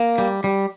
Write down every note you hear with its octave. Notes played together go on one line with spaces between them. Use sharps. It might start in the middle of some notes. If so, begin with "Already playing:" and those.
Already playing: A#3
G3
G3